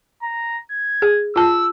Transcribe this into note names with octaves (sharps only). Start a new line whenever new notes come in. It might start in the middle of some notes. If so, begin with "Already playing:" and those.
A#5
G#6
G#4
F4 A5 E6